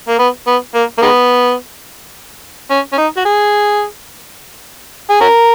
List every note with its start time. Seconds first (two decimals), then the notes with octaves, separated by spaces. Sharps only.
0.08 A#3
0.19 B3
0.47 B3
0.75 A#3
0.98 A#3
1.02 D#3 G#3 B3
2.71 C#4
2.93 C#4
2.98 D#4
3.17 F#4
3.25 G#4
5.10 G#4
5.21 C#4 F#4 A#4